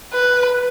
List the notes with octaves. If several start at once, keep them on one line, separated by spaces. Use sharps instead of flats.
B4